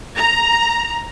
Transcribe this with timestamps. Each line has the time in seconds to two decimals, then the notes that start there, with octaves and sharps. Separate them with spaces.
0.16 A#5